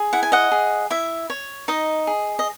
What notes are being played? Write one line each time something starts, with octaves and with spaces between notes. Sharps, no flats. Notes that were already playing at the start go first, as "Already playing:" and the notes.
Already playing: G#4
E4 F#5
G#5
D#5 F#5
G#4
E4 E5
C#5
D#4 D#5
G#4
D#5